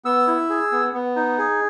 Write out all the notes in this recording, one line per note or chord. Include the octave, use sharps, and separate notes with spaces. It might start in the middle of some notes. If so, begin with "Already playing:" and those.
B3 E6
E4
G#4
B3
B3
D#4
G#4